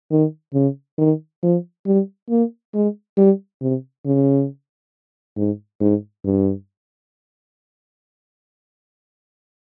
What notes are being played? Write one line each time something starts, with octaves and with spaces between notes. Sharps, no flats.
D#3
C#3
D#3
F3
G3
A#3
G#3
G3
C3
C#3
G#2
G#2
G2